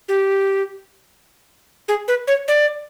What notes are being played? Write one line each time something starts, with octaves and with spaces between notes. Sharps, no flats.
G4
G#4
B4
C#5
D5